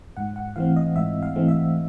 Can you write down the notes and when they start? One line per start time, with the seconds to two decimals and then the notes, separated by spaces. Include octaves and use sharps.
0.17 G#2 F#5
0.36 F#5
0.56 E3 A3 C4 F5
0.76 D#5
0.96 G#2 E5
1.23 F5
1.36 E3 A3 C4
1.48 E5